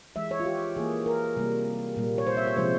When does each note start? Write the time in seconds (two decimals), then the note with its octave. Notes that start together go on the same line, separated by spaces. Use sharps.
0.16 E3 G#3 E5
0.31 C#5
0.40 F4
0.46 G4
0.76 E3 A#3 G#4
1.06 A#4
1.36 C3 G3 A#3
1.97 A#2 G3 A#3
2.18 C#5
2.27 C5
2.37 E5
2.47 C#5
2.57 C3 F3 G#3 C5